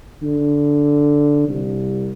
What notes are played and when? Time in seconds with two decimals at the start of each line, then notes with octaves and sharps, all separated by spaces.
0.23 D3
1.49 C2